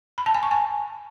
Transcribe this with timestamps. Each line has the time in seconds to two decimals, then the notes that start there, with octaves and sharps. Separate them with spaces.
0.18 B5
0.26 A5
0.34 G#5
0.43 C#6
0.51 G#5